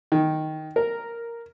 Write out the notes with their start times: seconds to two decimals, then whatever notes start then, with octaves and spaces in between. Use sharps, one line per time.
0.12 D#3
0.76 A#4